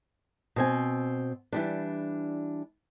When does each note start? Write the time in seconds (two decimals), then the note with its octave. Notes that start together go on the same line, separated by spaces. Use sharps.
0.56 B2 C4 G#5
1.52 E3 G3 D4